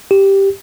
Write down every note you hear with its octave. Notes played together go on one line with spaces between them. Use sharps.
G4